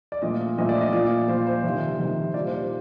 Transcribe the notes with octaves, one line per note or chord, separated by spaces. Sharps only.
D5
A#2 F3 A3 D#5
A#2 F3 A3 D#5
D5
D#5
A#2 F3 A#3 D5
A#2 F3 A#3 C5
C5
F2 C3 D#3
F2 C3 D#3
A#2 G3 A#3 D5
C5
D5